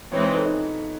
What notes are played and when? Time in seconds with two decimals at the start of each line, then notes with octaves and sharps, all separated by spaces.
0.12 E3 G#3 C4 D#4 C#5
0.23 B4
0.35 A4
0.45 D#4